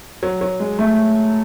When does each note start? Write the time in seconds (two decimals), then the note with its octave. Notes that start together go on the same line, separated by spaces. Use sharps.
0.23 F#3
0.41 F#3
0.60 G#3
0.79 A3